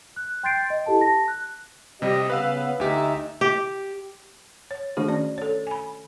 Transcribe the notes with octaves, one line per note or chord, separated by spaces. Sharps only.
F#6
G5 C6 G6 A6 C7 D7
D#5
E4 G4 A4 A5
A5 A#6
F#6
C3 G3 G4 D#5
C#3 B3 B4 F5 E6
D2 D#4 G4 E5
G4
C#5
D#3 A3 D4 F#4 G#4
C#4 D5
A4 C#5
G#5 B5